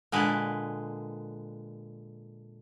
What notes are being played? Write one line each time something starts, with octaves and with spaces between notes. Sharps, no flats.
A#2 D3 G#3 B4